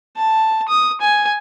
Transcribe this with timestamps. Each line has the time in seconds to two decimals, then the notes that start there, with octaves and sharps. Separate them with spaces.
0.17 A5
0.68 D#6
1.01 G#5